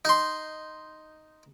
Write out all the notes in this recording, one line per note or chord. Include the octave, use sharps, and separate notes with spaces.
D#4 C6